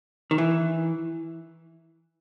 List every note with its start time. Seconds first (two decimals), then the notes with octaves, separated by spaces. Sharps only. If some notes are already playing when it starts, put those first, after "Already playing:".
0.31 D#3
0.38 E3